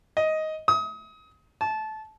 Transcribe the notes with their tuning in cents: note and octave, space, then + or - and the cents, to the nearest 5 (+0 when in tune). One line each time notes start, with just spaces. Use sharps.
D#5 +10
D#6 +30
A5 -20